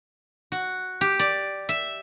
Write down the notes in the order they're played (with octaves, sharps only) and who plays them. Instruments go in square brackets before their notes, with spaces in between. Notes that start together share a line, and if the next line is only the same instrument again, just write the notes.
[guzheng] F#4
G4
D5
E5